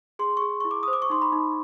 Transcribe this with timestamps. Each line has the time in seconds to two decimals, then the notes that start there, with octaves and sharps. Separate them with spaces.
0.19 G#4 C6
0.37 G#4 C#6
0.60 E4 C#6
0.71 D6
0.83 D#6
0.88 C5
0.93 D6
1.02 C#6
1.10 D#4 C6
1.22 B5
1.33 D#4